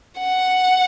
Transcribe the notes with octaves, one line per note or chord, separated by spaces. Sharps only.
F#5